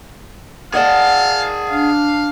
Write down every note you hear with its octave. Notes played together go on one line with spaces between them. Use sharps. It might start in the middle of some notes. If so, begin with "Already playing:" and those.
G#4 D5 D#5 F5 F#5 A5
D4 F5